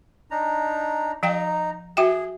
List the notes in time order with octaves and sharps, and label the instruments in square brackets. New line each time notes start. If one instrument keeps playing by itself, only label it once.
[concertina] D4 D#4 A#5
[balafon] F3 F5 G5 [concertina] D#4 A#5
[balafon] F#4 E5 G5 [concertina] G#4